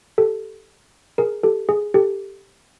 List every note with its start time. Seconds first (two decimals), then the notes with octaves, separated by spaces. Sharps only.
0.18 G4 A4
1.18 G#4 A#4
1.43 G4 A4
1.69 G#4
1.94 G4 A4